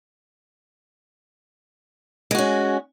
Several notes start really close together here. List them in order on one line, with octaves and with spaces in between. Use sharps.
G#3 F#4 C#4